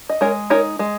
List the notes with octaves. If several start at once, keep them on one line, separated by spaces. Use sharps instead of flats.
D#5
G#3 A#4 C#5
D#4 A#4 C#5
G#3